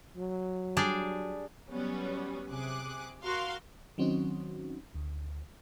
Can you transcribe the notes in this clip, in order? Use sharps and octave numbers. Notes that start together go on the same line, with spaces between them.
F#3
G3 D4 G#4
F#3 G3 B3 C#4
C3 G#4 D6 F#6
F#4 A#4 F5 C6 F6
D#3 F#3 C4 C#4 D#4 F#4
D2